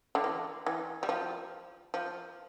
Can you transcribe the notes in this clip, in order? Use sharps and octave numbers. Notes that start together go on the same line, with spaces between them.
D3
E3
E3
G3
F3
F3